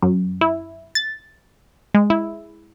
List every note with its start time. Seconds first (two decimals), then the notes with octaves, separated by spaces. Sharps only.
0.02 F#2
0.41 E4
0.95 A6
1.94 G#3
2.10 E4